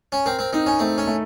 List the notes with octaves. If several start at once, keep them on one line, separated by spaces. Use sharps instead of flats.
C#4
C4 A#4
C4
C4 D#4
C#4
A3 C4
C#4
A3